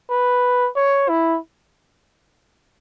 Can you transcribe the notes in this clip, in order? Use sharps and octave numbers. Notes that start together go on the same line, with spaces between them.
B4
C#5
E4